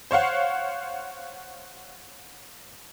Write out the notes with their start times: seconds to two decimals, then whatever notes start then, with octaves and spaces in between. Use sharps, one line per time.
0.11 C5 C#5 F5 F#5